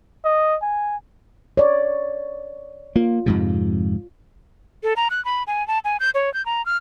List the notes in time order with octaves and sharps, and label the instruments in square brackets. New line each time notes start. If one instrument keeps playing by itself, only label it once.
[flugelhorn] D#5
G#5
[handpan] C#5 D5
[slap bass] A#3 [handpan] F4
[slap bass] F2 G#2 C3
[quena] A4
A#5
F#6
B5
G#5
A5
G#5
G6
C#5
G6
A#5
F6